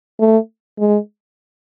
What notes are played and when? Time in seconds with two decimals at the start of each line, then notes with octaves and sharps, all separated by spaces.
0.20 A3
0.79 G#3